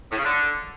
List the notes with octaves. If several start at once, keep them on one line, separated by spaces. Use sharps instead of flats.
A2
C#3
D3